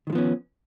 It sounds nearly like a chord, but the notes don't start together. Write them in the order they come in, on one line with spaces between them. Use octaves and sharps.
D#3 G#3 F3 B3 C#4